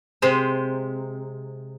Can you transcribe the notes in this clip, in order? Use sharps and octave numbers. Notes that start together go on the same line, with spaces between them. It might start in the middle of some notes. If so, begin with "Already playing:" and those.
C3 G#3 C5